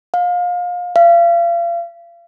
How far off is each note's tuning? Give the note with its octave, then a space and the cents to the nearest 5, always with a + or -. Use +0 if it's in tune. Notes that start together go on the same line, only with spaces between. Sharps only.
F5 +30
F5 -35